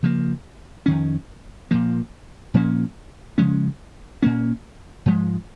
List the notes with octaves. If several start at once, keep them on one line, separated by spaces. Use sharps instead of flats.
C#3 F3 A#3
F2 D#3 C#4
A#2 F3 A#3
A#2 F3 A#3 C#4
C#3 F3 G#3 C#4
A#2 A#3 C#4
G#2 F3 G#3